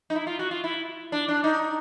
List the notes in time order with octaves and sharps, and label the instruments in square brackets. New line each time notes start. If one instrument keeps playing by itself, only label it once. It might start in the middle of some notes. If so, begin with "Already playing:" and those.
[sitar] D#4
E4
F4
F#4
F4
E4
D4
D4
D#4